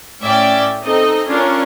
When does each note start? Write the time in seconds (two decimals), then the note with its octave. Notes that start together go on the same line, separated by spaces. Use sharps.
0.21 A2 C#4 D5 E5 G5 A6
0.83 C4 D#4 A4 D#5
1.27 C#4 D4 F4 A#4 C#5